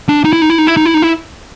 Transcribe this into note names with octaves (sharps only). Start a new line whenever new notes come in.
D4
D#4
E4
D#4
E4
D#4
E4
D#4
E4
D#4
E4